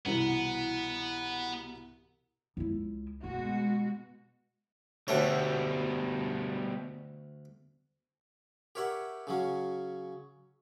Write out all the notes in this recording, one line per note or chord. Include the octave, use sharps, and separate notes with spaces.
C2 B2 E3 B3
C#2 E4
B2 G#3 A3 F#4
D2 B2 G3 A3 C#5
G4 A#4 C#5 E5 F#5
C#3 F#3 C#4